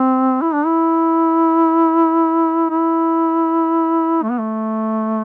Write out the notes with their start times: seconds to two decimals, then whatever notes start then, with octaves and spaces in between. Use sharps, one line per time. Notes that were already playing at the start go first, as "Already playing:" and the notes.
Already playing: C4
0.42 E4
0.54 D4
0.66 E4
2.70 E4
4.22 A3
4.31 B3
4.39 A3